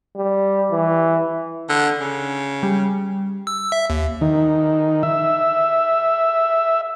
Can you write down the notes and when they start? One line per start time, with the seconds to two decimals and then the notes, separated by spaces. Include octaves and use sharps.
0.17 G3
0.71 E3
1.69 D3
2.00 C#3
2.63 G3
3.47 E6
3.72 E5
3.90 D#2
4.21 D#3
5.03 E5